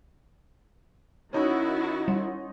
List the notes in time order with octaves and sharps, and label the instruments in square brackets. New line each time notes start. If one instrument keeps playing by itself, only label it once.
[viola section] D#3 E4 F#4 [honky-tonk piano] C#4 D#4
[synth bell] G3